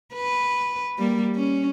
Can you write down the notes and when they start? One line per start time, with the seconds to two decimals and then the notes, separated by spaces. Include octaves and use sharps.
0.14 B4
0.99 G3 A#3
1.35 C#4